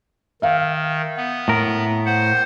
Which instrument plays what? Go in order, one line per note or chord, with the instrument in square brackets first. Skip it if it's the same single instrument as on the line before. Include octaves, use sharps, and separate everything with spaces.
[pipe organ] D#3 [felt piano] E5 F5
[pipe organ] B3
[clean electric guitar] A2 A#4
[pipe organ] C5 F#5